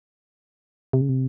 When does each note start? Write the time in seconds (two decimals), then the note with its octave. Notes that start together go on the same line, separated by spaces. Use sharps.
0.93 C3
1.01 C#3
1.09 C3